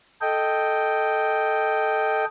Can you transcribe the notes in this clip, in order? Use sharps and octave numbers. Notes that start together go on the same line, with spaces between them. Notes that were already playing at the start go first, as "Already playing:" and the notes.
A4 D#5 G5